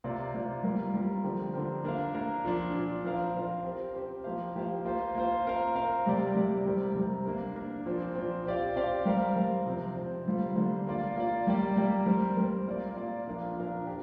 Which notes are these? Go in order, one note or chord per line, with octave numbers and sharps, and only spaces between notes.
C3 A#3 F4 D5
C3 A#3 F4 D5
G3 A#3 F4 A#4
G3 A#3 F4 A#4
D3 F3 C4 G4 A#4
D3 F3 C4 G4 A#4
A#3 D4 A#4 F5
A#3 D4 A#4 F5
A#2 F3 D4
A#2 F3 D4
F3 C4 A#4 F5
F3 C4 A#4 F5
C4 G4 C5
C4 G4 C5
F3 A#3 G4 C5 F5
F3 A#3 G4 C5 F5
A#3 F4 C5
A#3 F4 C5
C4 A#4 F5
C4 A#4 F5
C3 G3 A#3 G4 D5
C3 G3 A#3 G4 D5
C3 G3 C4 G4 A#4
C3 G3 C4 G4 A#4
A#3 D4 A#4
A#3 D4 A#4
A#2 F3 C4
A#2 F3 C4
C4 G4 D5 F5
C4 G4 D5 F5
G3 C4 A#4 F5
G3 C4 A#4 F5
C3 F3 C4
C3 F3 C4
D3 G3 A#3 F4 C5
D3 G3 A#3 F4 C5
A#3 F4 D5
A#3 F4 D5
G3 A#3 G4 D5
G3 A#3 G4 D5
G3 C4 A#4
G3 C4 A#4
A#2 A#3 F4 D5
A#2 A#3 F4 D5
A#2 F3 D4 A#4 F5
A#2 F3 D4 A#4 F5
G4